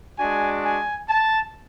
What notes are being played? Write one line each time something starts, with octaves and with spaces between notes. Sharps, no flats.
G#3 D4 F#4 G#5
G#5
A5